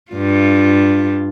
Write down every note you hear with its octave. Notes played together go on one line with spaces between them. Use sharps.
G2 F4